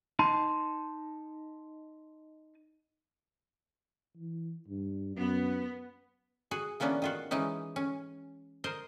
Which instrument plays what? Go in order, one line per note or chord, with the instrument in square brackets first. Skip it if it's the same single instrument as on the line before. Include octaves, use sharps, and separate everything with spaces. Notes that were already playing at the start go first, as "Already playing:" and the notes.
[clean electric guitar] D#4 A5 C6
[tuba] E3
G2
[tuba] F#2 [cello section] B3
[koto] F#4 G#4
E3 A#3 B3 C#4 D4
D#3 F4 F#4
E3 G#3 C#4 D#4
C#4
A#4 C5 D#5